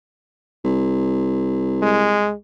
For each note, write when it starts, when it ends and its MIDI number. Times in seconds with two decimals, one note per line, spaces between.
0.64 2.38 36
1.82 2.34 56